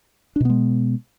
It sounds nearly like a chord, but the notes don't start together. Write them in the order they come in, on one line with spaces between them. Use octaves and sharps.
D4 B2 B3 G#3